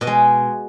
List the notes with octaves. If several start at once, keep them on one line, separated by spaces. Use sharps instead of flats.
B2 D#5
G#3